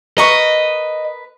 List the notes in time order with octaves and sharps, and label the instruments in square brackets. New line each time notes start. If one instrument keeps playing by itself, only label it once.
[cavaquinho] A#4 B4 C#6 [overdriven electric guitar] D#5